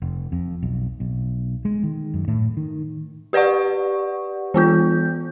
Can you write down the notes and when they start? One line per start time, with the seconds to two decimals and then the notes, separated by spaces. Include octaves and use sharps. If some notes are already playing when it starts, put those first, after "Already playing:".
0.02 F1
0.32 F2
0.63 B1
1.00 B1
1.65 G#3
1.83 D#3
2.14 F#2
2.28 A2
2.57 D#3
3.33 G4 B4 D5 F#5 C#6
4.54 E3 B3 F4 G6